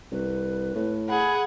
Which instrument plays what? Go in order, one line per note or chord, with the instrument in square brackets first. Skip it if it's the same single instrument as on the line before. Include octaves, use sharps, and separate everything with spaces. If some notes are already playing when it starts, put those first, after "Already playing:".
[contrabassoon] C2 [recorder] B4
[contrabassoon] A2
[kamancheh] G#4 F#5 [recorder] B5